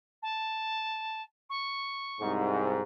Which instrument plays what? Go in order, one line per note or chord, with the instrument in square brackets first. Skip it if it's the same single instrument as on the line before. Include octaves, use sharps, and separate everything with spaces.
[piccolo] A5
C#6
[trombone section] C2 G#2